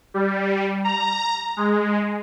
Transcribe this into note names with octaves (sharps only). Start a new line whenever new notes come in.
G3
A#5
G#3